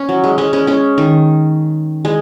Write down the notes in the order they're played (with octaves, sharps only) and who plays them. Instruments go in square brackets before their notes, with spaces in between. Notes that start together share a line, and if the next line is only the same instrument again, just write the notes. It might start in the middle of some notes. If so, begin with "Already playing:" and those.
Already playing: [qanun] C#4
F#3
G#3
G#3 C#4
G#3 C#4
G#3 C#4
D#3
G#3